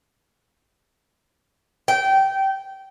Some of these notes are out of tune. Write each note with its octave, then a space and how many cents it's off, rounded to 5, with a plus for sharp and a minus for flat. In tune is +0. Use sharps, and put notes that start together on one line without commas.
G5 -20